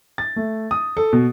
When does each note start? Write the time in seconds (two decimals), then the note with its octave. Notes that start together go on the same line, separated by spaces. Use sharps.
0.18 A6
0.36 A3
0.71 D#6
0.97 A4
1.13 B2